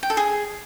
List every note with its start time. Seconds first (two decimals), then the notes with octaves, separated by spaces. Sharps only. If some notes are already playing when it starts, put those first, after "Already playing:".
0.03 G5
0.10 A4
0.17 G#4